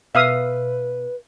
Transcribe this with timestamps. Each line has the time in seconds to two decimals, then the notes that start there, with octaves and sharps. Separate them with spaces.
0.15 B2 B4 E5 F5 D#6